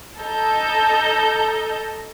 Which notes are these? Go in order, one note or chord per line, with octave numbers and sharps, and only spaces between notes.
A4 D#5 A#5 G6